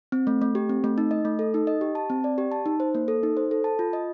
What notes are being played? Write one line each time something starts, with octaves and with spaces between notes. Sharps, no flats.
C4
A3
A3
G4
C4
A3
D#4
D#5
A3
A4
D#4
D#5
G4
A5
C4
D5
G4
A5
D#4
C5
A#3
A4
D#4
C5
A4
A5
F4
D#5